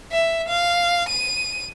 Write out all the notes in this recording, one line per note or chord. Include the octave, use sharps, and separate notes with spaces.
E5
F5
D#7